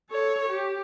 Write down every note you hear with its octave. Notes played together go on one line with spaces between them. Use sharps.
A4 C#5
G4